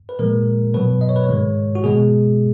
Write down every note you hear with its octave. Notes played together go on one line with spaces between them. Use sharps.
B4
A#2 F3 G#3 A#4
B2 F#3 B4
D#5
C#5
B4
C#5
G#2 D#3 G#3
F#4
B2 G#3 G#4